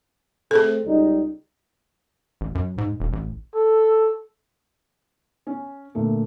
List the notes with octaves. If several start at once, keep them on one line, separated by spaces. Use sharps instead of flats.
A3 C4 G#4 A4
C#2 G3 D#4
A1
F#2
G#2
E1
A1
A4
C#4
D2 A#2 A3 A#3